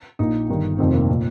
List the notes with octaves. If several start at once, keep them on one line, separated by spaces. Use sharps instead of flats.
A#1 A#2 D#4
G1 G2 D#3
F1 F2 D#3 C4
A#3
A#2